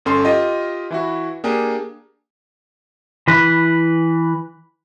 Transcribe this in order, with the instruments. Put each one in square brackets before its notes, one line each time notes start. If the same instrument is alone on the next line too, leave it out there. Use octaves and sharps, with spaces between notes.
[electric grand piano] G1 C#4 A4 C6
F4 G4 D#5
E3 E4 F#4
A#3 D4 G4 G#4
[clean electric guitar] E3 B4